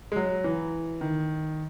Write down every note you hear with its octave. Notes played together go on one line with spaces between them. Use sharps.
G#3
F#3
E3
D#3